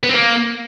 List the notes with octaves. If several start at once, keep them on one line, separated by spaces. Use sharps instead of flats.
B3
C4
A#3